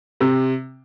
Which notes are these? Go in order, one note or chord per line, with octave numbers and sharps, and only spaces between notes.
C3